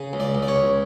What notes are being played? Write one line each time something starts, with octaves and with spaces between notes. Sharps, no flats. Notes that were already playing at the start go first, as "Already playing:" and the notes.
Already playing: C#3
C#2
D5
C#2
D5
C#5
C#2